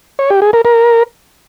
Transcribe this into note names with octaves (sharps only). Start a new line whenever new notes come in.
C#5
G4
G#4
A#4
A#4